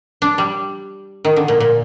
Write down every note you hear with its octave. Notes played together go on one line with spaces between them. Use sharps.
D4
G3
D#3
D3
A#2
A#2